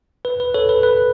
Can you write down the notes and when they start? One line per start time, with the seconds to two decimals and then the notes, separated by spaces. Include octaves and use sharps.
0.25 B4
0.40 B4
0.54 A4 C#5
0.69 B4
0.83 B4